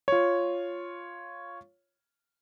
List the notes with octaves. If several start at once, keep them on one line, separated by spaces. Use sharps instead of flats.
F4 C#5